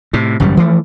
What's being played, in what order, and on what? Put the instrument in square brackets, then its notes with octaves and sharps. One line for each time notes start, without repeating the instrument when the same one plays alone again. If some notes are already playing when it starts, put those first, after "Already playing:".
[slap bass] A2 C3
G#1 F#2 C#3 G3
E3 F3 A3